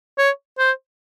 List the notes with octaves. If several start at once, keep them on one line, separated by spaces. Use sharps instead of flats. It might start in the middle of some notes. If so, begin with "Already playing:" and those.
C#5
C5